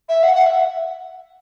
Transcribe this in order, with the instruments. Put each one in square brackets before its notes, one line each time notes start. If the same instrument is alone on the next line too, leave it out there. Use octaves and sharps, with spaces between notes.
[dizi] E5
F#5
F#5
E5